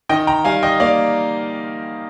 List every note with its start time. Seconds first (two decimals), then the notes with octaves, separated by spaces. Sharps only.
0.09 D#3 D#5 G5
0.27 G5 A#5
0.45 G3 F5 G#5
0.63 D#5 G5
0.80 A#3 D5 F5